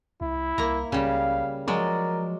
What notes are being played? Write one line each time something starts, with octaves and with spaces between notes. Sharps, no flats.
C2 E4
C2 A#3 A#5
C#2 C#3 G3 F5
F3 F#3 G#3 A#4 D5